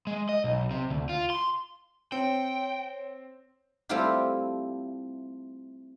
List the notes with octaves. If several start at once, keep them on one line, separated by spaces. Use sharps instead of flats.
G#3
D#5
B1
C3
D2
F4
C6
C4 C#5 G5
G3 A3 C4 E4 F4 G4